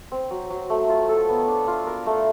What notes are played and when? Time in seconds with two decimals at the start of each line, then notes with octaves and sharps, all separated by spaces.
0.12 C4
0.31 F#3
0.50 F#3
0.70 A3
0.89 F4
1.09 A4
1.29 B3
1.48 D4
1.68 F4
1.87 A#4
2.06 A3